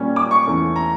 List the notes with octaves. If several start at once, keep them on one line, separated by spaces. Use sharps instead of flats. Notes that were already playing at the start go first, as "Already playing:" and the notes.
Already playing: A#2 G3 C#4
D6
C#6
E2 E3 A3 C#4
A#5